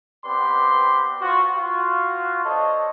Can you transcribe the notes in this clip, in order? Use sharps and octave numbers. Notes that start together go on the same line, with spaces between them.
B3 C4 G4 B4 D5 C6
F4 F#4 C5
F4 F#4
D4 A4 C5 C#5 D#5